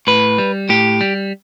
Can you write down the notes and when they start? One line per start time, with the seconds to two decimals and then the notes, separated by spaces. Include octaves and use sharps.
0.07 A2 B4
0.38 G3
0.69 A2 G4
1.01 G3